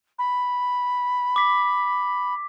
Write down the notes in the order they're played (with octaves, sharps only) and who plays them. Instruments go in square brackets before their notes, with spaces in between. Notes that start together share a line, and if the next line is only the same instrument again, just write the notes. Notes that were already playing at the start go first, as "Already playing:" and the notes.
[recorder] B5
[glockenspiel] D6 B6